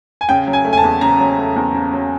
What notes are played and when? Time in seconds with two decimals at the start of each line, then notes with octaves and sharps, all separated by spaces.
0.21 G#5
0.29 C#3 G5
0.47 F#3
0.53 G#5
0.65 A3
0.73 G#5
0.78 A5
0.84 E2
1.01 C#3 A#5
1.20 F#3
1.38 A3
1.56 E2
1.74 C#3
1.93 F#3